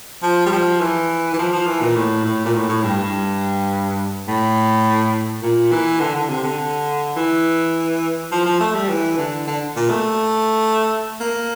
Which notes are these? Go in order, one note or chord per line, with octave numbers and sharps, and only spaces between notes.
F3
G3
F3
E3
E3
F3
F3
E3
A#2
A2
A2
A#2
A2
A2
G2
G2
A2
A#2
E3
D3
D3
C3
D3
E3
F3
F3
A3
G3
E3
D3
D3
A#2
A3
A#3